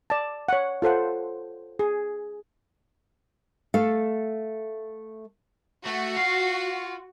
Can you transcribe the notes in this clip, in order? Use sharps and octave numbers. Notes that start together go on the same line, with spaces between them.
D5 A5
C#5 F#5
F4 A4 C5 F#5
G#4
A3 A4 F5
A3 F#4
F4